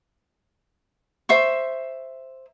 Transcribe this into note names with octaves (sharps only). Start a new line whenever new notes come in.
C5 E5 C#6